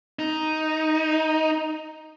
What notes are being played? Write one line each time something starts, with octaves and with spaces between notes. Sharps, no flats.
D#4